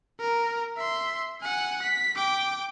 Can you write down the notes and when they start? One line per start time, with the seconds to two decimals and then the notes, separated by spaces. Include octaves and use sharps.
0.20 A#4
0.77 E5 C6
1.41 F#5 G#5
1.83 B6
2.16 G5 D6